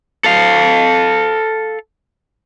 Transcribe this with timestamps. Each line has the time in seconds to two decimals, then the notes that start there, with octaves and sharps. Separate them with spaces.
0.24 A4 F5